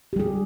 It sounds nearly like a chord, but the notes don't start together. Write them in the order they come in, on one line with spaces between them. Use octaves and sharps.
G4 G3 G#4